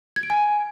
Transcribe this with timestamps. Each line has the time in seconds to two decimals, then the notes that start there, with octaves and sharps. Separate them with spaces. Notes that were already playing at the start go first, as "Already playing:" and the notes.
0.16 G#6
0.23 D7
0.30 G#5